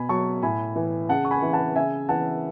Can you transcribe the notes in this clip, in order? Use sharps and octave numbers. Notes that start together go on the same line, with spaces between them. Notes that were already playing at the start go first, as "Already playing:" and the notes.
Already playing: B2 G#5 B5
F#3 A5 C#6
A2 G#5 B5
E3
C#3 F#5 A5
C#6
G#5 B5
E3
F#5 A5
C#3 E5 G#5
E3 F#5 A5